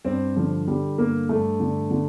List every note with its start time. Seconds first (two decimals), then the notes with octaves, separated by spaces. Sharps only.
0.05 G2 C4
0.36 D3 F3
0.67 D3 G3
0.98 G2 A#3
1.29 G2 A3
1.60 D3
1.91 D3